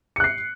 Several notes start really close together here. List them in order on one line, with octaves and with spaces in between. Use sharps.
C#7 F#6 C7